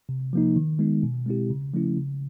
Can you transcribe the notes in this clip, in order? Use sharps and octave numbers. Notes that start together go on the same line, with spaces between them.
C3
F3 A#3 D#4
D#3
G#3 B3 D#4
B2
G#3 C4 E4 G4
C#3
F3 A3 C#4 E4
C#3